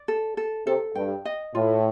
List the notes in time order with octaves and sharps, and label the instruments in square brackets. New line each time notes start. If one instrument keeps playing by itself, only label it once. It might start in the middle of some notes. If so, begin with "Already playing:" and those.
Already playing: [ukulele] D5
A4
A4
[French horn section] C3 [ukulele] A4
[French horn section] G2 [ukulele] G5
[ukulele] D#5
[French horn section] A2 [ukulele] F4